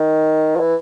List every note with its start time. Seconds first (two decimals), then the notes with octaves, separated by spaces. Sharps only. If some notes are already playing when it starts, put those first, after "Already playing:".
Already playing: D#3
0.56 F3
0.60 E3